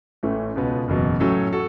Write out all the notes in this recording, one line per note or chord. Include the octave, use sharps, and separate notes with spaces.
A1 A2 E3 A3 C#4
C#2 B2 B3
F#1 E2 B2 F#3
A2 F#3 C#4 A4
F#4 A4